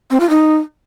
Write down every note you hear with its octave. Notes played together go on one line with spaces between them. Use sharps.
C4
F4
D#4